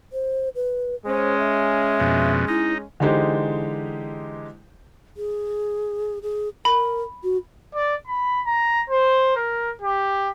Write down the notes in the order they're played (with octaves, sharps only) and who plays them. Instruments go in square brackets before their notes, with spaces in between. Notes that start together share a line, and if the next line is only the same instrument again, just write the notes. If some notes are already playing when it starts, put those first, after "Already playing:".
[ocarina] C5
B4
[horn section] G#3 C#4 [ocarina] C5
[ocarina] E5
[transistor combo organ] F2 B2
[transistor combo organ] D#4 [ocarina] E4
[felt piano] D3 E3 G#3 D#4 G4 C5
[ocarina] G#4
G#4
[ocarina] A#4 [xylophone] B5
[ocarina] F#4
[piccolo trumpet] D5
B5
A#5
C5
A#4
G4